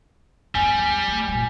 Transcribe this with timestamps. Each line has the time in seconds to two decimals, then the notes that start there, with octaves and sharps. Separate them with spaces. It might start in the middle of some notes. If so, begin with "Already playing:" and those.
0.55 E2 G3 G#5
1.08 A3
1.29 A#2 G3 G#5